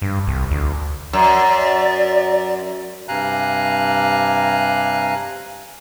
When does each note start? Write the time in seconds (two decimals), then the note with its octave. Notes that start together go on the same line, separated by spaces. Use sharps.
0.02 G2
0.27 C2
0.51 D2
1.13 F#2 D5
3.08 G2 C3 F5 G#5 A#5 F#6